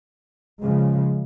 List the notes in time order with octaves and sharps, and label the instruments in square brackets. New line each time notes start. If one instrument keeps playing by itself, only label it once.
[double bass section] C#3 F3 G#3